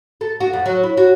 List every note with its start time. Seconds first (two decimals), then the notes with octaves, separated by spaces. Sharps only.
0.21 A4
0.40 F#4
0.53 F2
0.66 F#3
0.83 E4
0.97 F#4